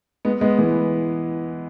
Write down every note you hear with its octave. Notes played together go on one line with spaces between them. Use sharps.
G#3 B3
G#3 B3
E3 G#3